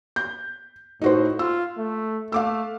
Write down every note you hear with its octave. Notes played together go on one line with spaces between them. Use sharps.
G6
A2 D#4 F#4 C5
F4 E6
A3
A3 F5 D6 E6